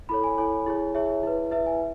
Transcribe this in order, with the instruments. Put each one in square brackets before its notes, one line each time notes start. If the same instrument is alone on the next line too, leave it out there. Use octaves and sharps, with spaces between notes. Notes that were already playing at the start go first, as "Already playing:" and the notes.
[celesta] E4 A4 C#5 B5
G#5
E4 A4 C#5 G#5
E4 G#4 C#5
E4 G#4 C#5 E5
E4 B4
E4 B4 E5
G#5